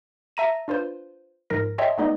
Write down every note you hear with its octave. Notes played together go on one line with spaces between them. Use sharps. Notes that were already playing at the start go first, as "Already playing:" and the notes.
E5 A5 A#5 A#6 D#7
D4 F4 B4 C5
G#2 F3 A#4 A#6
C#5 D#5 E5 G5 A5 C6
G#3 A3 B3 D#4 D5 D#5